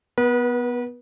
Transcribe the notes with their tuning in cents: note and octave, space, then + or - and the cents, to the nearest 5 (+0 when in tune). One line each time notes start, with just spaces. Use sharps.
B3 +0 B4 -35